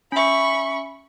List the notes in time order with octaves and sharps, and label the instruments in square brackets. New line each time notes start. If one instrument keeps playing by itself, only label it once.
[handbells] C#4 E5 [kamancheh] B5 C#6